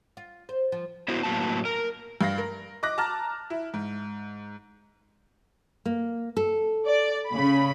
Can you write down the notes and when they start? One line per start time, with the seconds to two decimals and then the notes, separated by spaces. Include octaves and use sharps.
0.17 F4
0.49 C5
0.72 F3
1.08 B3 E4 F#4 C5
1.23 A2 F#3 A#3 B3 A5
1.65 A#4
2.21 G2 F5 A#6
2.38 A#4
2.83 D#5 D6 F#6 A#6
2.98 A5 A#5 D6 F6 A6
3.50 E4
3.74 G#2
5.85 A#3
6.37 A4
6.88 D5
7.29 C#3 B5